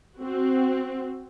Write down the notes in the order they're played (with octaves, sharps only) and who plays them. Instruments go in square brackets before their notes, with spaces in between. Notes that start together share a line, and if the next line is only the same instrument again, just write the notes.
[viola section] C4 F#4